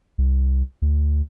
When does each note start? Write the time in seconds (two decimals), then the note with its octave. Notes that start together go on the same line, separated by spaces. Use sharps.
0.18 C2
0.82 D2